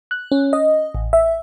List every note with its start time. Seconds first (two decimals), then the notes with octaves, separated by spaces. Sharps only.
0.11 F#6
0.32 C#4
0.53 D#5
0.95 A1
1.13 E5